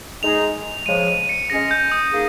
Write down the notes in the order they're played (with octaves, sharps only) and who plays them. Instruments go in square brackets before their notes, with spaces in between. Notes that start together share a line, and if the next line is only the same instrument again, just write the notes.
[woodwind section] G#3 D#4 G#4 [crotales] F7
[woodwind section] C#3 F3 G#3 [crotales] D#7
[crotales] D#7
C#7
[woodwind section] G#3 C#4 G#4 [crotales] A#6
[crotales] G6
D#6
[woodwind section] A#3 D#4 G#4